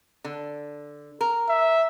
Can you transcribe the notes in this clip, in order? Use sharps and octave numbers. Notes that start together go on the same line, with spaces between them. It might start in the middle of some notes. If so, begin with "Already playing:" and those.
D3
A#4
E5